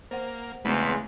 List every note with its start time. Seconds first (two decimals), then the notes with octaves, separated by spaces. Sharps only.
0.11 A#3 C5 F#5
0.65 E2 C#3 G#3 A3 B3 C4 B4